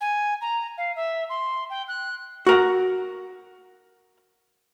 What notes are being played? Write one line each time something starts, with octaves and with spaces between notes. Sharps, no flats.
G#5
A#5
F5
E5
C6
G5
F#6
F#4 A#4 F#5